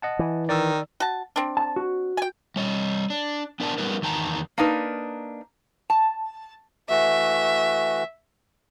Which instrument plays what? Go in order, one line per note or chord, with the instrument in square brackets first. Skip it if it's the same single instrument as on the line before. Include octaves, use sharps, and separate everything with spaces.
[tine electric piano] D#5 F#5 A5
[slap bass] E3
[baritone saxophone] D#3 [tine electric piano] D5 E6
[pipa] F#4 A5
C4 D4
[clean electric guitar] A5
F#4
[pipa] G5 G#5
[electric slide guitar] G3 C#5 D#5
D4
B3 D4 A#4 D5 A5
G3 B3 D#4 G4 A#4 B4
E2 D#3 G5 A5 A#5
[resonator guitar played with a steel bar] A#3 D4 D#4 B4
A5
[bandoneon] E3 A3 F#4 [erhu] E5